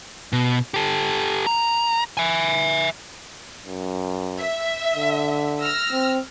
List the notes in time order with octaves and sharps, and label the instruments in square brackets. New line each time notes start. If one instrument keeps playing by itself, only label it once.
[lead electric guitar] B2
G4 A4
A#5
E5 G#5
[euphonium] F#2
[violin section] E5
[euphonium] D3
[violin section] E6 F6 A#6
[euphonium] C4